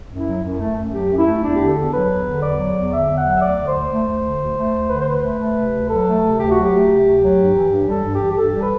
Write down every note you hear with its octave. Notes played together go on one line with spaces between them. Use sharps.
F#2
E4
F#3
F#2
A3
F#2
F#3 G4
F#2
E4
A3
E2 D4
D3 G4
A4
E2
F#3 B4
E2
D3
E2 D5
F#3
E2
D3 E5
E2
F#5
F#3
E5
D2 D5
D3
C5
D2
A3
D2
D3
D2
A3
D2
D3 B4
C5
D2 B4
A3
A3
C3
D2
F#3 A4
A3
C3
D2 G4
F#3 F#4
G4
A3
C3
D2
F#3
G2
E3
G2
G3 A4
G2
G4
E3
G4
G2 A4
G3
B4